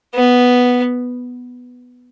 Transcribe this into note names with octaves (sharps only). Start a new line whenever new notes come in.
B3